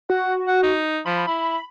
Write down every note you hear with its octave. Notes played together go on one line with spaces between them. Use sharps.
F#4 F#5
F#5
D#4
F3 B5
E4 B5